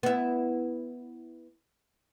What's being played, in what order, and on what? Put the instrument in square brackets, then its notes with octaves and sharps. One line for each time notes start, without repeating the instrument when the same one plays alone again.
[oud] B3 E4